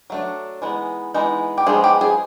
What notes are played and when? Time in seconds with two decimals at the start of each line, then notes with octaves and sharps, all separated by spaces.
0.10 F#3 A3 D4
0.62 E3 G#3 B3 D#4
1.14 E3 G#3 B3 D#4
1.58 G4
1.66 F3 G#3 B3 D#4 G#4
1.84 G4
2.01 G#4